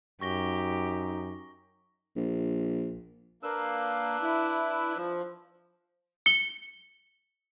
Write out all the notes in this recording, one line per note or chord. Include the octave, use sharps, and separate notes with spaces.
F#2 D#4 G4 C#6 A#6 G7
A#1
A#3 D4 B4 E6
E4
F3
C#7 G7